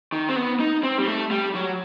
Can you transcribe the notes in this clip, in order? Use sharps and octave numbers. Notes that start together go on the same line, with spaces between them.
D#3
C4
B3
D#4
C4
G3
A3
G3
F#3